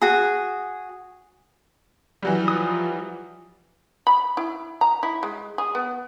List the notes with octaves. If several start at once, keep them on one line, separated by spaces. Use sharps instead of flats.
F#4 G#4
E3 F#3 G3
F3 D#6
B5
E4
A#5
E4
G#3
G#4
B3